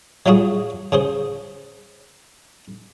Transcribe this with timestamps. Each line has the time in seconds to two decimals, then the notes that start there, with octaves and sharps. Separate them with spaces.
0.26 F#3 G3 F4 F#4 G#4
0.92 C#3 G#4 C5